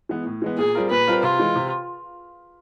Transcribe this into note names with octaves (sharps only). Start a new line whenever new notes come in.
E3 G#3 B3
A2
E3 G#3 B3
A#2 G#4
G3 C4 F4 A#4
A#2 B4
G3 C4 F4 A#4
C3 F4
E3 G#3
C3